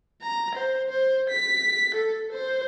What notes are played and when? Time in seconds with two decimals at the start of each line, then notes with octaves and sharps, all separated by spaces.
0.22 A#5
0.55 C5
0.90 C5
1.30 B6
1.95 A4
2.32 C5